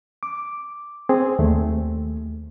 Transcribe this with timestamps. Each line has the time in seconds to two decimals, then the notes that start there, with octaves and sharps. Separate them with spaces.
0.23 D6
1.09 C4 G#4
1.39 D#2 A3